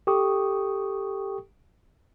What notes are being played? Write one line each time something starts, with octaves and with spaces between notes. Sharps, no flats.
G4 A4 G5 C#6 D#6